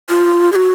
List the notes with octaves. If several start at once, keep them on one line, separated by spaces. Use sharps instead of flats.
F4
G#4
F#4